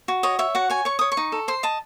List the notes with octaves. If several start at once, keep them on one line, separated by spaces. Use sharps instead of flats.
F#4
C#5 D#5
C#5 E5
F#4 F#5
C#5 G#5
C#5 C#6
C#5 D#6
C#6
D#4
A4
C5 C6
D#5 A5